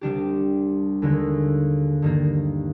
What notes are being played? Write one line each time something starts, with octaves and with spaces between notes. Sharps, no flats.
C2 C3 G3 D4 G4
D#2 D3 G#3
G2 D#3 A#3